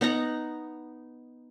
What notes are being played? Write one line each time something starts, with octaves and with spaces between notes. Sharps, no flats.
B3 D#4 F#5 A#5